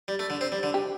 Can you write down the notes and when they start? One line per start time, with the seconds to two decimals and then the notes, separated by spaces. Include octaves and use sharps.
0.08 G3
0.19 A3
0.30 D3
0.41 C4
0.52 G3
0.63 D3
0.74 G4